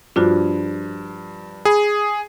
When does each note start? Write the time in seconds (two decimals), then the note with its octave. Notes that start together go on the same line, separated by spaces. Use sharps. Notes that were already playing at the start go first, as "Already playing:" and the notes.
0.16 G2 F3 D4 F4 F#4
1.65 G#4 B5